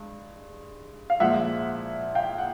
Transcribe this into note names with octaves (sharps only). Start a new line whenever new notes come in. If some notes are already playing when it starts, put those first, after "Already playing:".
Already playing: G2 G#3
F5
A#2 F3 G#3 E5 F#5
F5 G5
F#5